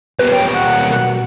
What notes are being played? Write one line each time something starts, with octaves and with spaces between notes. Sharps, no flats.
G3 A#3 B3 B4
C#5 G5
F#5
A#4
B2